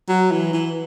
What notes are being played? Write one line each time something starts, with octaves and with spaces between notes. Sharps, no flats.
F#3
E3
E3